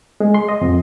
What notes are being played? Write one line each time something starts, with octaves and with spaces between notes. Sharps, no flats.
G#3
C6
D#5
F2